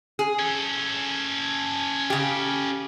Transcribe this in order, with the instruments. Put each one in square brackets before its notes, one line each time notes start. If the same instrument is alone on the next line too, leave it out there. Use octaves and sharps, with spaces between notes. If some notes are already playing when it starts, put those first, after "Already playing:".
[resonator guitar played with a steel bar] G#4
[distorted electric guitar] C#4 A4
[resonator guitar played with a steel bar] C#3 G4